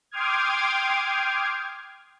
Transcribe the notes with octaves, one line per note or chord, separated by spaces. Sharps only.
G5 C6 D6 D#6 F6 G#6